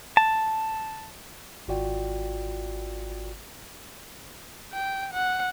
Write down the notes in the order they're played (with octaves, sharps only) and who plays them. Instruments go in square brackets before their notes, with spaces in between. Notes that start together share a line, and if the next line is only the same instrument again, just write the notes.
[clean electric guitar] A5
[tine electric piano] G#1 F4 F#4 D5 G5
[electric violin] G5
F#5